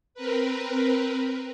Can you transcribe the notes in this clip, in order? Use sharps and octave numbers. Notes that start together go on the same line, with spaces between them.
C4 A#4 B4